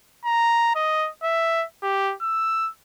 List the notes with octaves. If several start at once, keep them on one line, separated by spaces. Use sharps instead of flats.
A#5
D#5
E5
G4
E6